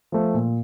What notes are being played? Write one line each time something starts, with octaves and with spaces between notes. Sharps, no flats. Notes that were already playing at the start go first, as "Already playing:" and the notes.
F3 A3
A#2